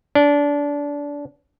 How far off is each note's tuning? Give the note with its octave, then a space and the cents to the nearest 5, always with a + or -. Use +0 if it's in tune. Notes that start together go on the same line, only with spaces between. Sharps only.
D4 -25